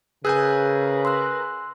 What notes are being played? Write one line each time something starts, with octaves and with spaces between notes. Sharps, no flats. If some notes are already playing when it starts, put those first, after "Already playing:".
C#3 G#4 A#4 B4 G#5 E6 F#6 G6
C6 E6 F#6